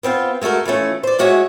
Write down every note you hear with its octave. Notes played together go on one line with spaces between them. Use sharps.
B3 C4 D#4 F4
G#3 A3 F#4 A4 A#4
E3 F3 A3 C#4
C5 D5
A2 G#3 F#4 C#5 E5 G#5